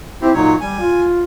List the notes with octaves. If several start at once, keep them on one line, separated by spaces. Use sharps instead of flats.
C4 E4 G4
A#2 F#3 D#4 C#5
G3 G#5
F4